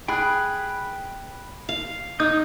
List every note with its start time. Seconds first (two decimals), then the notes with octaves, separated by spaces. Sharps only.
0.08 G#4 G5 B5 F#6
1.69 F5
2.20 D#4 D#6 G6